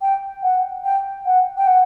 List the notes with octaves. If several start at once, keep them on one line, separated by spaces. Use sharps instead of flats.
G5
F#5
G5
F#5
G5
F#5